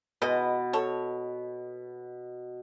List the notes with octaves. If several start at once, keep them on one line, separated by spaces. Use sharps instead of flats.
B2 G#3 B4 D#5
A4 C#5